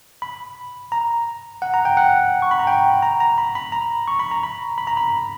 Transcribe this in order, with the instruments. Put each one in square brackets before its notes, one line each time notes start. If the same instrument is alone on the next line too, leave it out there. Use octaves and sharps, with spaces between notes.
[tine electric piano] B5
A#5
F#5
A#5
G5
F#5
C#6
B5
A#5
G5
A#5
A#5
B5
B5
A#5
C#6
B5
A#5
B5
B5
A#5
B5